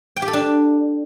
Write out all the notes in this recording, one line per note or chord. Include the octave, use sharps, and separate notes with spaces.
G5
G4
A4
D4